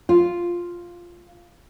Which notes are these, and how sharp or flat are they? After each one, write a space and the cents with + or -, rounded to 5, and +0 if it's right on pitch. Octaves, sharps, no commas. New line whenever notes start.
F4 +0